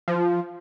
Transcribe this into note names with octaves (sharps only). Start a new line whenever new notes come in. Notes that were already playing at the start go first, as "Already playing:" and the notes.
F3